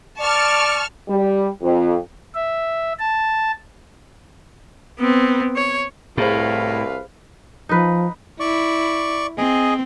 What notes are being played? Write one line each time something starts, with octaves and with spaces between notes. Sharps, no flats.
D5 A5 C#6 F6
G3
F2
E5
A5
B3 C4
C#5
C2 A2 G#4 B4 C5 F5
F3 D#4 B4
E4 D5 C#6
C4 G#4 D#5